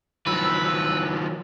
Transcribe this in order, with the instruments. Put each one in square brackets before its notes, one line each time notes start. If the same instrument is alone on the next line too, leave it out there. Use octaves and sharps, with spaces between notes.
[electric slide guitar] D#3 F3 F#3 [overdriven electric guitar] B4 [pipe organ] E6